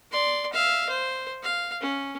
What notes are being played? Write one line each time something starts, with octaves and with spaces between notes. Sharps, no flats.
D5 C6
E5 F5
C5
F5
C#4